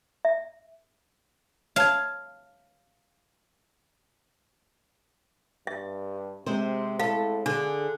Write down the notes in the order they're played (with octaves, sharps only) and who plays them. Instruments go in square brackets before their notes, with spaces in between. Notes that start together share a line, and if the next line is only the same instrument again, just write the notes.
[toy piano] E5
[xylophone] C#5 A5 G#6 [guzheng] F5
[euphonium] G2 [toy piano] E5
[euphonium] C3 [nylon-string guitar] G#3 C4 C5
[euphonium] A2 [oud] A4 [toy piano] F5
[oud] D3 [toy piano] D4 [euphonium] G#4